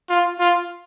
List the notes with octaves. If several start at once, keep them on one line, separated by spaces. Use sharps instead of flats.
F4
F4